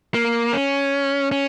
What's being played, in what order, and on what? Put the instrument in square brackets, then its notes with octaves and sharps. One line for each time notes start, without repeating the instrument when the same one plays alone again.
[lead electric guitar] A#3
C#4
C#4